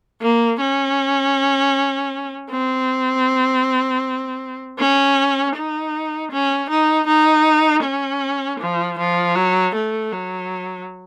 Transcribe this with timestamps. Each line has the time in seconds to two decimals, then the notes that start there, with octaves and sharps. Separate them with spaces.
0.21 A#3
0.61 C#4
2.51 C4
4.79 C#4
5.56 D#4
6.32 C#4
6.70 D#4
7.07 D#4
7.84 C#4
8.60 F3
8.99 F3
9.36 F#3
9.75 A3
10.12 F#3